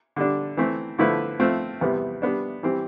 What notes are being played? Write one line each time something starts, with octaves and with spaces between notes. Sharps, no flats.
D3 G3 D4
E3 A3 C4
D3 F3 A3 E4 B4
F3 A3 C4 F4
E2 C3 G3 B3
G3 B3 D4
E3 G3 C4 G4